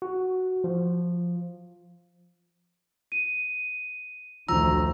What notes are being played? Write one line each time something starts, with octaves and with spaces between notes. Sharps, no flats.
F#4
F3
D#7
D2 D#3 F3 A#5 E6